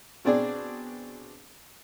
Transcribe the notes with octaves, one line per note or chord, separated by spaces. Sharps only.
B2 C4 D4 G#4 D5